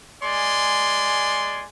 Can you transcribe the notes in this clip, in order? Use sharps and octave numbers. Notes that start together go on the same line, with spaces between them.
G#3 D5 G#5 C6